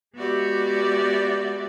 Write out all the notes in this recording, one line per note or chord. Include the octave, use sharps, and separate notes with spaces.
G#3 B3 F#4 G4 D5 E5